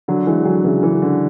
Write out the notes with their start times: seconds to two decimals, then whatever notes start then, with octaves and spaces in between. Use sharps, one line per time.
0.08 D3 F#3
0.27 E3 G#3
0.45 D3 F#3
0.64 C#3 E3
0.83 C#3 E3
1.02 D3